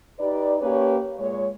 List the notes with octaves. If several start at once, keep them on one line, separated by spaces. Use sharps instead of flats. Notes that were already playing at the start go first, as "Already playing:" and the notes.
D#4 G4 B4 D5
A#3 C#4 G4 B4 C#5
A#2 G#3 C#5